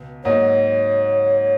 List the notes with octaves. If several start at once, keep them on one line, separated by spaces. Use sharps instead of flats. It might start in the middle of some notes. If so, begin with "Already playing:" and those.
Already playing: C#2 B2
G#2 F#3 A#3 D#4 F#4 C#5